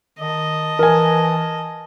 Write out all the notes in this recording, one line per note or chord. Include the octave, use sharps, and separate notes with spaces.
D#3 D#5 A5
E3 A#4 G#5